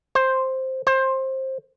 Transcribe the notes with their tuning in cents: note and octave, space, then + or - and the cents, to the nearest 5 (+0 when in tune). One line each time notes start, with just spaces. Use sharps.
C5 +5
C5 +20